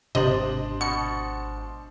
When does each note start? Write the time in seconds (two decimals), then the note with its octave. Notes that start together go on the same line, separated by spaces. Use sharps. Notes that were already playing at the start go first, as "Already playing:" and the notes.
0.15 G#1 C3 D4 C5 D#5 F#7
0.81 B2 C#7